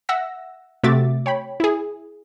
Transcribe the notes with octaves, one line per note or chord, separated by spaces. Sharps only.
E5 F#5 E6 A#6
C3 A3 F#4 E5 D6 A6
C#5 G5 B5
E4 G#4